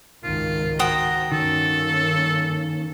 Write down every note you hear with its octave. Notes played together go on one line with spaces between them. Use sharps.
G#1 C#2 D#3 F4
F#4 C5 G5 A#5 D#6
G2 D#3 A#3 C#4 A4